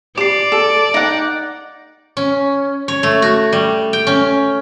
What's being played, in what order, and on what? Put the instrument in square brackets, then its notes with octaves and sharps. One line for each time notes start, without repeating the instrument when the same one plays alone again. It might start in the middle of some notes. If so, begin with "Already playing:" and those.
[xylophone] G4 C7 [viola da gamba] D5 [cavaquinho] D6
[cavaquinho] A4
D#4 F#5
[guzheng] C#4
C#5
A3
F#4
G3
G5
C#4